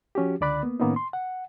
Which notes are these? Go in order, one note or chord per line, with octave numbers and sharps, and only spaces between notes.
F3 C#4 F#4 G4
C#2 D3 D5 B5 F#6
A#3 B3
A2 D#3 A#3 B3 C#4 D#4
C6
F#5